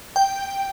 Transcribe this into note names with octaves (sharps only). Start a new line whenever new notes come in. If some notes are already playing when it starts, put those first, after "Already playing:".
G5